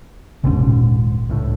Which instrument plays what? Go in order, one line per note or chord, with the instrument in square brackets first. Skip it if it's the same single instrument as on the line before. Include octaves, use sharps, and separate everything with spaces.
[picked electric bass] G1 D#2 G#2 [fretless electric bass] C3 C#4
[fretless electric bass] A#2
[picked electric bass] C#2 A2 D3